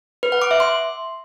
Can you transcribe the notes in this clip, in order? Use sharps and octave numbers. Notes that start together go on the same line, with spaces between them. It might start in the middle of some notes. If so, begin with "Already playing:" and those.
B4
F#5
D6
E5
C6